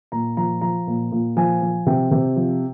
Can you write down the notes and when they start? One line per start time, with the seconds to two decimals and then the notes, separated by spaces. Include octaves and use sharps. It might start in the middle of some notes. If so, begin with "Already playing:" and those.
0.12 A#2 A#5
0.37 F3 A#5
0.61 F3 A#5
0.87 A#2
1.12 A#2
1.37 F3 G#5
1.62 F3
1.86 C3 G5
2.11 C3
2.36 F3